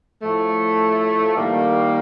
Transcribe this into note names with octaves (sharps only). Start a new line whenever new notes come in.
A2 F3 A3
D#3 G3 A#3